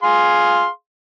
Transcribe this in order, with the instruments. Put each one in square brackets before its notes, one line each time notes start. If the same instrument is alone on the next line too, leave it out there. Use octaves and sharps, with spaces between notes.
[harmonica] G#4 F5 C6